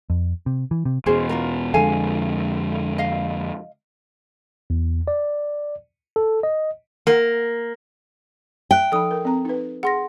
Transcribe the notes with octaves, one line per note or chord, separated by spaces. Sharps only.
F2
C3
E3
C3
E2 B2 C#4 G#4 C5
C#4 F4 A#4
F2 D3 G#3 A4 F5 G#5
D#5 F5
E2
D5
A4
D#5
A#3
E5 G5 F#6
F3 D#4 A4 B5 D#6
A#4
C4 A#5
D#4 B4
G#4 F#5 C6 A#6